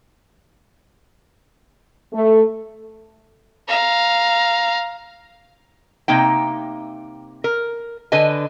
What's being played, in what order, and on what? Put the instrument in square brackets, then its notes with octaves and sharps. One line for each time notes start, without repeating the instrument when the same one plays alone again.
[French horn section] A3
[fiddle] F5 A#5
[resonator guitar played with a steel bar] C3 A#3 D#4 G5
A#4
D3 B4 D#5 G#5